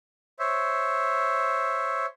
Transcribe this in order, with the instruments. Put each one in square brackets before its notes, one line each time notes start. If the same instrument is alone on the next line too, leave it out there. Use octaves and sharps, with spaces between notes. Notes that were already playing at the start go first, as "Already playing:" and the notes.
[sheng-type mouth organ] C5 C#5 E5